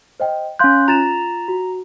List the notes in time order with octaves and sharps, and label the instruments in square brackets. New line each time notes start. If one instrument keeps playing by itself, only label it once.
[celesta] C5 D#5 G5
[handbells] C#4 F#6 [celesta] F5 C6 G6
[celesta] F4 A6 E7 [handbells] A#5
[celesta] F#4